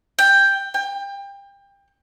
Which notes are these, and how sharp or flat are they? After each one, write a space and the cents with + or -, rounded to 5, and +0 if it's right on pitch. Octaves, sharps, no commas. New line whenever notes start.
G5 +10
G5 +25